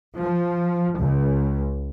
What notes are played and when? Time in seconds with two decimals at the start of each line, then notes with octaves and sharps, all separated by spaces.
0.20 F3
0.99 C#2